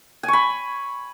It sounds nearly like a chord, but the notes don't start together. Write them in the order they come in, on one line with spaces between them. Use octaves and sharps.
G#5 C#6 B5